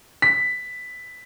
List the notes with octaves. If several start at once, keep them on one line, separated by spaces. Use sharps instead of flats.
B6